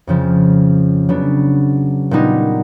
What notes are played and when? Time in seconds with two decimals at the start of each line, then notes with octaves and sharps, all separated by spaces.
0.07 F2 C#3 F3
1.09 C#3 F#3 B3 D4
2.11 A#2 G3 B3 D#4